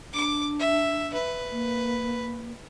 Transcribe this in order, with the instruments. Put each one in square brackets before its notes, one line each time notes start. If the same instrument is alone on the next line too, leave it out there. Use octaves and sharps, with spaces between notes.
[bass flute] D4 [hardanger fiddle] D6
[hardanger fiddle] E5
B4
[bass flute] A#3